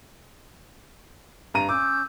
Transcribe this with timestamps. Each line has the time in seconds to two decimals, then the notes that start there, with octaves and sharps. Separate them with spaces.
1.54 G2 A#5 D#7
1.69 C#4 D6 E6 G6